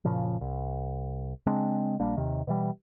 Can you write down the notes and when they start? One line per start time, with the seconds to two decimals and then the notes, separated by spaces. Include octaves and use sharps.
0.05 F#1 A#2 C#3 F3
0.41 C2
1.46 C#3 G#3 C4 D4
2.00 A#1 G3 A#3 D4
2.17 D#2 C3 D#3
2.47 B2 E3 G3